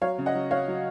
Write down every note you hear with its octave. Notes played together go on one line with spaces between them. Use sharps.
F#3 C#5 F5
C#3
D#5 F#5
F#3
F#3 C#5 F5
F#3